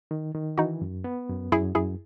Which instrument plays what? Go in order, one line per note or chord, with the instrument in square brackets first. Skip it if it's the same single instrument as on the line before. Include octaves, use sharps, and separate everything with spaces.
[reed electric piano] D#3
D#3
[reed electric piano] E3 [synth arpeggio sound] D#4 F#4
[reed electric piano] F#2
B3
F#2
[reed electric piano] F#2 [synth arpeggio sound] E4 G#4
[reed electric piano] F#2 [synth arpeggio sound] E4 G#4